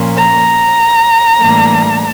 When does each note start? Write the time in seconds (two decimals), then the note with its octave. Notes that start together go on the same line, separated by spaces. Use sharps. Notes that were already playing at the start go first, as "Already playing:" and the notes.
Already playing: A#2 F3 A#3 C#4
0.17 A#5
1.40 A2 E3 G3 A#3 D4